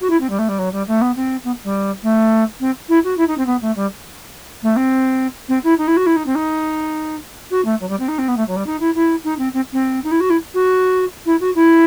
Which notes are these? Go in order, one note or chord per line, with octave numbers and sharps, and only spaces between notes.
F#4
E4
C4
G3
A3
G3
F#3
G3
A3
B3
C4
B3
G3
A3
C4
E4
F#4
E4
D#4
C4
B3
A3
G3
A3
C4
C4
E4
D#4
E4
F#4
E4
D#4
C4
D#4
F#4
A3
F#3
G3
C4
D#4
C4
B3
A3
F#3
G3
D#4
E4
E4
D#4
C4
C4
C4
D#4
E4
F#4
E4
F#4
E4
F#4
E4